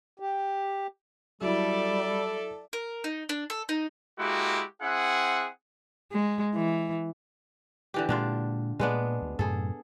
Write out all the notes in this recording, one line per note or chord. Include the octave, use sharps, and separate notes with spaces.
G4
F#3 G3 E4 A4 D5 E5
A#4
D#4
D4
A4
D#4
G#3 A#3 E4 F#4 G4
C4 E4 G#4 F#5
G#3
E3
D3 E3 G4
A#2 D3 G#3 D4 F4
A#2 G#3 B3 D4
D2
F#2 A2 C3 G#4 A4